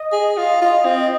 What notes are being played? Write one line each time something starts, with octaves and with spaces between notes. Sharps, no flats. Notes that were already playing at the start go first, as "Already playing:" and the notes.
Already playing: D#5
G#4
F4
F4
C4